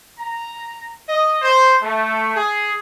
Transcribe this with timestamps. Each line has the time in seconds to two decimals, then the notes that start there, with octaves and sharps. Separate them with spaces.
0.18 A#5
1.08 D#5
1.42 C5
1.82 A3
2.35 G#4